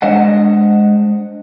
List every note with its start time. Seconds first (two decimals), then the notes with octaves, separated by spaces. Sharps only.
0.02 G#3 D4 C5 D#5 F#5